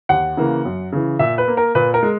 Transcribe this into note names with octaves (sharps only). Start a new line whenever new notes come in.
D#2 F#5
C#3 E3 A#3
F#2
C#3 E3
A#2 E5
B4
A#3
A#4
A#2 B4
A#4
G#3